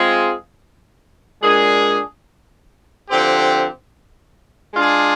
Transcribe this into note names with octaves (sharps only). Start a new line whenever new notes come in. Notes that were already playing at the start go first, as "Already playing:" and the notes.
Already playing: G#3 C4 F4 G#4
A#2 G#3 D4 G#4
D3 F3 C4 G4
G#3 D4 F4 G#4